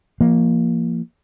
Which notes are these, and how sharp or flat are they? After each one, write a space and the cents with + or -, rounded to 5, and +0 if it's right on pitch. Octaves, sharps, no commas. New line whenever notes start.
F3 -30 A#3 +0